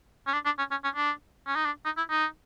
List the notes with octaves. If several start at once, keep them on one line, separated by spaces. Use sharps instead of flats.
C#4
D4
D4
C#4
C#4
C#4
D4
C#4
D#4
D4
D#4
E4
D#4